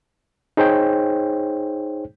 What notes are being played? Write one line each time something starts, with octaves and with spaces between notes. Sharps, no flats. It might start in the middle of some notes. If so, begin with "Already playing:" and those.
D#4 G#4 C5 C#5 G5